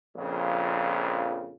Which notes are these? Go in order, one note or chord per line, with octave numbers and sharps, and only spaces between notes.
A#1 F2 C#3